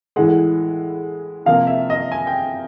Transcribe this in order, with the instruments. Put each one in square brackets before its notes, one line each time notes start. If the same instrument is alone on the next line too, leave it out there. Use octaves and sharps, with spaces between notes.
[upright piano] A2 E3 G#3 F#5
C3 F3 A#3 F5
E5
D#5
G#5
G5